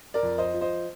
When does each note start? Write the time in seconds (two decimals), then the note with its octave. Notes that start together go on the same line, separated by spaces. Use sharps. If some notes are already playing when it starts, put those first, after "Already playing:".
0.14 A#4 D5
0.23 F2
0.38 C5 D#5
0.54 F3
0.61 C5 D#5